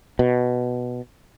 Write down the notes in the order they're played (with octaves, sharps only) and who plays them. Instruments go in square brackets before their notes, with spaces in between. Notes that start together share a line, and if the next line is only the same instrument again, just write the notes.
[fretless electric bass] B2